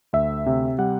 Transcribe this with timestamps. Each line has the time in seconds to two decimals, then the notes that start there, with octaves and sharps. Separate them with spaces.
0.13 D2 E5
0.46 C3
0.78 G3 F#5